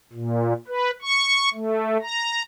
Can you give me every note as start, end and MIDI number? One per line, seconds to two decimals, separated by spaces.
0.13 0.53 46
0.68 0.91 71
1.02 1.49 85
1.54 1.97 57
2.02 2.43 82